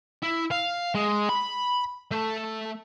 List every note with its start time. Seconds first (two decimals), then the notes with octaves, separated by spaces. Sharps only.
0.23 E4
0.51 F5
0.95 G#3
1.29 B5
2.11 A3